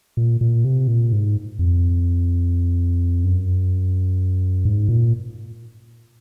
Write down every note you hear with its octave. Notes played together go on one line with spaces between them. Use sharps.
A#2
A#2
C3
A#2
G#2
F2
F#2
G#2
A#2